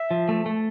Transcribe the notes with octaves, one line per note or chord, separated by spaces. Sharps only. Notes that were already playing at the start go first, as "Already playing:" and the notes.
Already playing: E5
F3
A3
A3